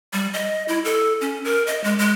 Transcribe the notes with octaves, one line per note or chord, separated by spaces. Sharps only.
G3
D#5
E4
A4
C#4
A#4
D#5
G#3
G#3